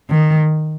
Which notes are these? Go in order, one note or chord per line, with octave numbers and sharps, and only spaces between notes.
D#3